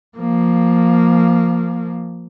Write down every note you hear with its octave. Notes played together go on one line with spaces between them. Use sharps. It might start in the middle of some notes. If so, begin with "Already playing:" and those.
F3 A#3